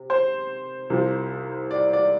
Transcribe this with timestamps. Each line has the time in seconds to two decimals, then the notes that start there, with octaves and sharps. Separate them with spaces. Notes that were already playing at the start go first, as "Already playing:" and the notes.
Already playing: C3
0.10 C5
0.90 C2 C3 F3
1.71 D5
1.93 D5